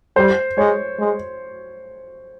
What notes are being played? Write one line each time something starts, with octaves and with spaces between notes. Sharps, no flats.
G3 C5
G#3 C#5
G#3